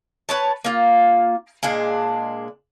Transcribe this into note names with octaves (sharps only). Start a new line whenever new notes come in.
B4 C#5 A5
A#3 F4
A#2 G#3 D4